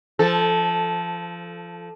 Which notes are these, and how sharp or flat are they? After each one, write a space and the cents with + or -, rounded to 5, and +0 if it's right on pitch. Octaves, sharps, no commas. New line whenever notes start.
F3 -20 A4 -10